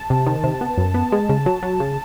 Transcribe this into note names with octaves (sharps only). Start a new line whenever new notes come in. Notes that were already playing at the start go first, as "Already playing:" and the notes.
Already playing: A5
C3
D#3
C3
B3
F#2
B3
G#3
C#3
F#3
F#3
C#3